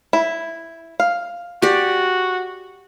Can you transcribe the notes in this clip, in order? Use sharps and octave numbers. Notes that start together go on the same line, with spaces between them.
E4
F5
F#4 G4 D5